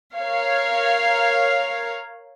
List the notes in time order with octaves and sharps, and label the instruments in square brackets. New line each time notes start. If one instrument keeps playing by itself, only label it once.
[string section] A#4 C#5 F5